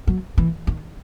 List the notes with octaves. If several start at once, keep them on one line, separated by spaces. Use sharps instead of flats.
F#3
E3
D#3